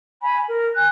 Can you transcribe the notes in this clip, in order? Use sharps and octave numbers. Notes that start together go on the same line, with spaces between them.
G#5 B5
A#4
G#5 F#6